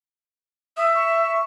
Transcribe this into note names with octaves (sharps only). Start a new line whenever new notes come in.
E5 D#6
C#6